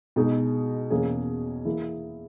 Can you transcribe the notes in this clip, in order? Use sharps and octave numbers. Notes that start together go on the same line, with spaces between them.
B2 G#3 D#4 G#4
E2 B2 A#3 C#4 G#4
E3 A#3 E4 G#4